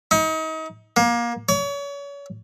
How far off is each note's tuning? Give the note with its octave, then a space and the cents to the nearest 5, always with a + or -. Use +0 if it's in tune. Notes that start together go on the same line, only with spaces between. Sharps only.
D#4 +35
A#3 +25
C#5 +35